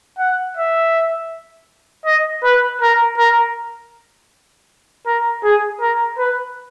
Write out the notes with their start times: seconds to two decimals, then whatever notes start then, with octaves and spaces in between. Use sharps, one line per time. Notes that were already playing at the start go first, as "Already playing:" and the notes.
0.18 F#5
0.57 E5
2.06 D#5
2.43 B4
2.82 A#4
3.18 A#4
5.06 A#4
5.43 G#4
5.81 A#4
6.18 B4